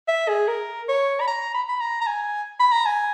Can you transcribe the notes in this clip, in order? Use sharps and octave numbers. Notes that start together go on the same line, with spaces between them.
E5
G#4
A#4
C#5
B5
A#5
B5
B5
A#5
A#5
G#5
B5
A#5
G#5